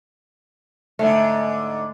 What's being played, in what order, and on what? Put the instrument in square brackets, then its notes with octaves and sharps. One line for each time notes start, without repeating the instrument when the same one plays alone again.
[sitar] G#2 D3 [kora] A3